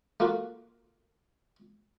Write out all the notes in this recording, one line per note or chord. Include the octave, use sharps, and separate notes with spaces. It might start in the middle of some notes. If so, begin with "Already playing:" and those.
A3 A#3 F4 F#4